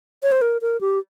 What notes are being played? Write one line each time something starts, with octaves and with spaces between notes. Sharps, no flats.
C#5
C5
A#4
A#4
G4